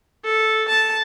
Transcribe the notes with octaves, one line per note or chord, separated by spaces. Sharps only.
A4
A5